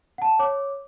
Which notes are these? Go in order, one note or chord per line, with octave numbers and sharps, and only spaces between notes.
F#5 A5
C#5 D6